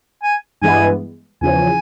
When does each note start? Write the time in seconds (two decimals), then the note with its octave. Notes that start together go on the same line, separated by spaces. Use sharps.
0.23 G#5
0.62 G2 E3 G#3 B3 G#5
1.41 E2 C#3 F3 G#5